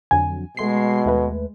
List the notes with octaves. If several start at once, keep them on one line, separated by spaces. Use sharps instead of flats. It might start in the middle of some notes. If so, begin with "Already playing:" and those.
F2 D3 F#3 G#5
B2 G#3 A3 C6 C7
D#2 A3 B4